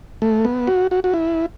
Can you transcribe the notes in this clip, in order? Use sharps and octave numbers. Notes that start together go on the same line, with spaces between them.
A3
B3
F#4
F#4
F#4
E4